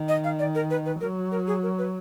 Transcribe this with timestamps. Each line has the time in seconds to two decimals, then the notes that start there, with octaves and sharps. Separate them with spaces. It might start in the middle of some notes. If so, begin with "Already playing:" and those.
Already playing: D#3
0.09 D#5
0.24 F5
0.39 D5
0.55 A#4
0.70 B4
0.86 B4
1.00 F#3 A#4
1.32 A#4
1.47 G#4
1.63 A#4
1.78 B4